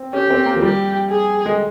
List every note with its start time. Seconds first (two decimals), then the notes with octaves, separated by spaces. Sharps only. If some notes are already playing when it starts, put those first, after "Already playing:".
Already playing: C4
0.13 C#4 G4
0.30 C4
0.46 A#3
0.56 F3
0.62 G3 G4
1.10 G#4
1.46 G#3